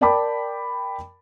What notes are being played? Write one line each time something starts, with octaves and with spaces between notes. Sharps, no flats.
A#4 D5 G5 A5 B5 D6